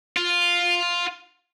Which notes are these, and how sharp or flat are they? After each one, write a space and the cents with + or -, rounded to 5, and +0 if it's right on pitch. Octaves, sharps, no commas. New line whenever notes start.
F4 +5